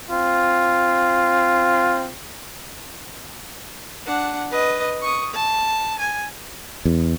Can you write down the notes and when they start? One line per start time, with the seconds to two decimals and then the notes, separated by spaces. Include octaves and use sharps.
0.10 C4 F4
4.06 D4 F#5
4.51 B4 D#5
5.02 C#6 D#6
5.34 A5
5.99 G#5
6.85 E2